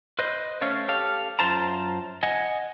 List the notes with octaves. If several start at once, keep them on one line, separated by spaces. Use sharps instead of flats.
B4 C5 D#5
A3 C#4 C#5 F5
G4 A4 F5
F#2 F4 C5 A5 A#5
D#5 F#5 G#5